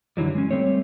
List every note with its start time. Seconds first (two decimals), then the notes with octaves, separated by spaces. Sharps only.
0.17 F#2 D3 E3 F#3 G3
0.35 G#3 C#4
0.51 G3 A3 C4 C#5